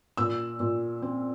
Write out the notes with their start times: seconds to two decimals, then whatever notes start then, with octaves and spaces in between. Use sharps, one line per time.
0.17 A#2 E6
0.60 A#2
1.02 C4